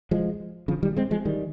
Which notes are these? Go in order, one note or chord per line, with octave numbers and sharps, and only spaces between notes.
F3 G#3
C#3 F3
D#3 G3
G#3 C4
F3 G#3
D#3 G3